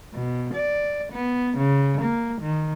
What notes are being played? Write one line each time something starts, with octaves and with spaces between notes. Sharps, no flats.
B2
D5
B3
C#3
A#3
D#3